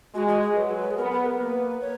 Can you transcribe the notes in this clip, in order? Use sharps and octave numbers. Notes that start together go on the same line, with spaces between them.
G#3 F#4
F#4
G#4
F#3 B4
G#4
B3 A#4
B4
A#4
A#3 B4
C#5